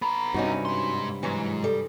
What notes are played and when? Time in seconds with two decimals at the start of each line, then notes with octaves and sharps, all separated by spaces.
0.02 B3 A#5 B5
0.34 G2 C3 C#4 D#4 F#4
0.65 G#2 C6
1.23 G#2 E3 F#3
1.64 G3 A4